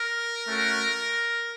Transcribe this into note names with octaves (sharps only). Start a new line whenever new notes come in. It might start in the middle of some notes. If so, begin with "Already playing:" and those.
Already playing: A#4
A3 C#4 F#4